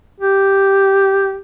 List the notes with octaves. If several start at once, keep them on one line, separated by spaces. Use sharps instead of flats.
G4